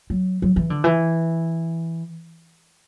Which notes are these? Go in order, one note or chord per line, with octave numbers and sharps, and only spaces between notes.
F#3
F#3
E3
D3
E3